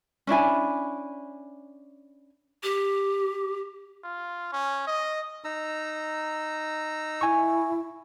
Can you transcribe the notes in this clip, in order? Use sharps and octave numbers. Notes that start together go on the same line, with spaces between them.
C#4 D4 E4 G#5
G4
F4
C#4
D#5
D#4 A#5 E6
E4 G#5 C#6